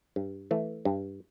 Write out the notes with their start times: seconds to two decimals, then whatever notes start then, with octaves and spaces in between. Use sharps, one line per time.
0.16 G2
0.51 E3 A3
0.85 G2